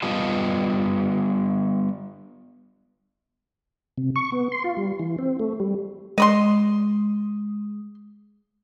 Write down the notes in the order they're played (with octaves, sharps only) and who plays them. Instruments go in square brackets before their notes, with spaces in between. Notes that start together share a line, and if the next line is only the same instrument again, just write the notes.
[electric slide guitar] G3 B3 F4 G4 D#5 A5
[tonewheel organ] C3
C#6
B3
C6
F4
G3
E3
C4
A3
G3
[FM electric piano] G#3 [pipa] D#5 B5 C6